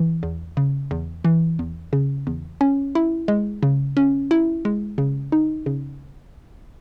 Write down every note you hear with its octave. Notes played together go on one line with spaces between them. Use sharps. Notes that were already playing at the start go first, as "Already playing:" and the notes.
Already playing: E3
E2
C#3
E2
E3
E2
C#3
E2
C#4
E4
G#3
C#3
C#4
E4
G#3
C#3
D#4
C#3